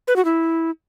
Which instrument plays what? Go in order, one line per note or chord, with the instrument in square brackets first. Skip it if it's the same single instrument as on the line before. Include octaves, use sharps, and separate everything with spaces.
[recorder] B4
F#4
E4